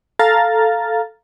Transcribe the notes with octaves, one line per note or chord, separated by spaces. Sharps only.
A4 F5 A#5 F6 A6